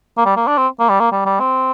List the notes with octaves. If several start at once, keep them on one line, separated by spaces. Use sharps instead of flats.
A#3
G3
A#3
D4
C4
A#3
G3
A#3
G3
G3
C4